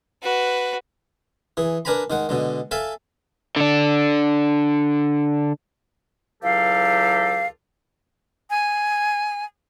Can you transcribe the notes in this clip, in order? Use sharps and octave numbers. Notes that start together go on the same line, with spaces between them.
F#4 B4
E3 G#4
D4 A#4 B4 G#5 A#5 B5
D#3 G#3 F#5
B2 D3 G#3
A4 E5 F5 G#5 A5
D3 D4
C#2 E3 F#3 G4 A4 F5
G#5